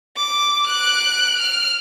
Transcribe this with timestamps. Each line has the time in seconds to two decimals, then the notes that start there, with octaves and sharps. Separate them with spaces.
0.17 D6
0.67 F#6 D7
1.39 F6